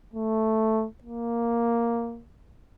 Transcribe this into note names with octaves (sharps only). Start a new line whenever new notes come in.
A3
A#3